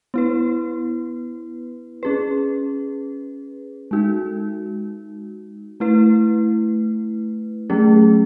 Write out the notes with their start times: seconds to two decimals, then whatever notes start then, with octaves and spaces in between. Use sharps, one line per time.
0.14 B3 E4 B4
2.03 C#4 G#4 B4
3.91 G#3 D#4 F#4
5.80 A3 E4 B4
7.70 F#3 A3 C#4 G#4